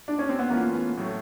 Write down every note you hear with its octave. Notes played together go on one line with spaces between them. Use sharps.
D4
C#4
C4
B3
E3 A3 A#3 C#4 F4
B3
A2 F#3 A3